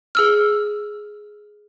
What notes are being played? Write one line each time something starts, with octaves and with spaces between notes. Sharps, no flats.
G#4 E6 F6